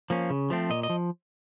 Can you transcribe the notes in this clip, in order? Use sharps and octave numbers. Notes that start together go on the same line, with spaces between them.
F3 A#3 C#4
C#3
F3 A3 C4
A#2 D#5
D#5
F3